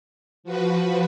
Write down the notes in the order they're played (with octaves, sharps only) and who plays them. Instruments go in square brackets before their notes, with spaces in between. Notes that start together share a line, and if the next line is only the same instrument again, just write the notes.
[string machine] F3 F#4 B4